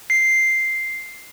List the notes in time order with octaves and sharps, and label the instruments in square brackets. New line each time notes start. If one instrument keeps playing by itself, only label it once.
[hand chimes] C7